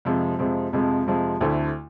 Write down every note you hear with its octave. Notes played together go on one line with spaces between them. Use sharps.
F2 C3 F3 G#3
F2 C3 F3 G#3
F2 C3 F3 G#3
F2 C3 F3 G#3
D2 D3 A3 C4 E4